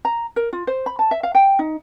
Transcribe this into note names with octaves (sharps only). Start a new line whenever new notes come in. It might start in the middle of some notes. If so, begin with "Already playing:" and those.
A#5
A#4
F4
C5
B5
A5
E5
F5
G5
D#4